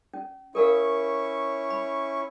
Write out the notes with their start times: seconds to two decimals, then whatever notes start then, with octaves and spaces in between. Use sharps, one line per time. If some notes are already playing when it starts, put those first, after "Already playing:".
0.14 C#4
0.55 C#4 E4 A4 A#4 F5 C#6
1.70 B5